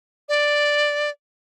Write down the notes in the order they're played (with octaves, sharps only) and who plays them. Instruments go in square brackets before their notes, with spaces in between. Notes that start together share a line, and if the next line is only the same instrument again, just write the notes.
[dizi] D5